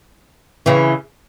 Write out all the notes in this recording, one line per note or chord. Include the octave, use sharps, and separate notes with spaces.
C#3 E3